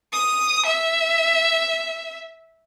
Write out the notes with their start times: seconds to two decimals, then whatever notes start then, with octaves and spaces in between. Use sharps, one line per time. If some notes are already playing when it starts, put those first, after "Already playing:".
0.13 D#6
0.66 E5